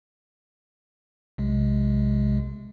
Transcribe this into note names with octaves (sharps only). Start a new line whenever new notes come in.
B1 C3 G#3